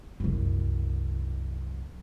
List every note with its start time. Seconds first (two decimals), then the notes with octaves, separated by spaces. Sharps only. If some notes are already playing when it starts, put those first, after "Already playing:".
0.20 C2 F#2